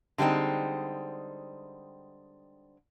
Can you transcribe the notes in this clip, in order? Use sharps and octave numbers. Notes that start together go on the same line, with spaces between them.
D3 G3 G#3 C4 D#4